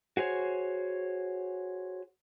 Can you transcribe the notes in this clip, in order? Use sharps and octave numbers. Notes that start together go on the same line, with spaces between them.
F#4 G#4 C5 C#5